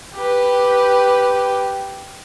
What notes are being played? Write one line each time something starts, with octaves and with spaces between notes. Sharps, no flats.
G4 B4